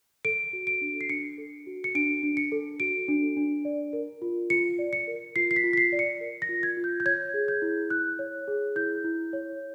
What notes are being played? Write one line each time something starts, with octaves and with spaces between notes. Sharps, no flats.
A4 D7
F#4
D7
D4
C7
D4 C#7
A4
F#4
C#7
D4 D7
D4
C#7
A4
F#4 D7
D4
D4
D5
A#4
F4
F4 C#7
D5
C#7
A#4
F4 C7
C7
B6
F4
B6
C7
D5
C#7
A#4
A#6
F4
G#6
F4
G6
G6
C#5 G#6
G#4
G6
E4
E4 F#6
C#5
G#4
E4 G6
E4
C#5